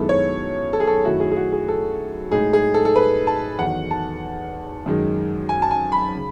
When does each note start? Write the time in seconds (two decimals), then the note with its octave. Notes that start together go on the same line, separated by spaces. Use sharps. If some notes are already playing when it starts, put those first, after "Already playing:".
Already playing: F#2 D#3 G#3 B3 E4 A4
0.09 C#5
0.73 A4
0.80 G#4
0.87 A4
1.05 F#2 D#3 F#3 A3 E4 F#4
1.20 G#4
1.31 G#4
1.37 F#4
1.52 G#4
1.68 A4
2.31 A2 G#3 D#4 G#4
2.53 G#4
2.74 A4
2.85 A4
2.96 B4
3.27 A5
3.59 E2 D#3 F#3 F#5
3.91 A5
4.86 F#2 D#3 G#3
5.49 G#5
5.62 A5
5.71 G#5
5.92 B5
6.15 C#3